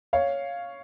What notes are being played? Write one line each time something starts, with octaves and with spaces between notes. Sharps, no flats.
C#5 F5